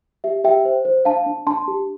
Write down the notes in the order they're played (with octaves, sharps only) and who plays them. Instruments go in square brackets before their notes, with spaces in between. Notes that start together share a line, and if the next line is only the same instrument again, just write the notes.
[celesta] G4 E5
G4 E5 G5
C5
C5
D4 F5 A5
D4
D4 A5 C6
G4